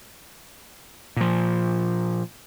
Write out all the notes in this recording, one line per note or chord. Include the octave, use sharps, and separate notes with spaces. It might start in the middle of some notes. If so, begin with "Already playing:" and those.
A#2 F3